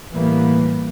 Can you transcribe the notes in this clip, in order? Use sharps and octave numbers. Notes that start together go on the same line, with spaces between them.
A2 E3 G3 A#3 B3